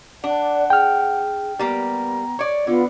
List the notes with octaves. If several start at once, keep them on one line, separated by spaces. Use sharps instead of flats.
D4 D5 F#5
G#4 G5 F6
G3 A#3 B3 A#5
C#5 D5
D3 B3 F4